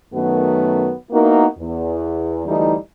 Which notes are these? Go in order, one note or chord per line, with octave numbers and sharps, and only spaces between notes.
F#2 D#3 F#3 A3 B3 F#4
A#3 B3 D#4 E4 F#4 A#4
E2
D2 E3 G3 A3 D#4